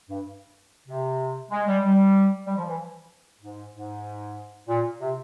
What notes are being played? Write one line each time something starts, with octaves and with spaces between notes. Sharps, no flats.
G2
C3
G#3
G3
G3
G3
F3
E3
G#2
G#2
A#2
C3